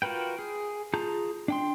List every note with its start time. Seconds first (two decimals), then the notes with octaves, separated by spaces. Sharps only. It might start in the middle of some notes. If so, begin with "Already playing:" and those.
0.02 F4 F#4 A#4 B4 G5
0.39 G#4
0.94 F4 G#4 A5 A#5 G6
1.48 D4 G5 C6